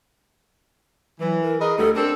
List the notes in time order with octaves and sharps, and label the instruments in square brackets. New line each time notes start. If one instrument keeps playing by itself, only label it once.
[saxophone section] E3 [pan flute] F#3
[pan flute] A#4
[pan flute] G#4 [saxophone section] A#4 B4 D#5
[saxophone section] D2 G3 [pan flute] A4
[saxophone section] C4 D4 A4 [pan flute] A#4